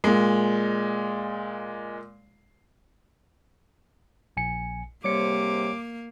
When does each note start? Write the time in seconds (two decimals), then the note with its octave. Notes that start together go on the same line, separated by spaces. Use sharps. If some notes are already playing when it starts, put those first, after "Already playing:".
0.04 A#2 G#3
4.37 A#1 G#5 C#7
5.04 G#2 C3 G3 A#3 C#5 D6 C#7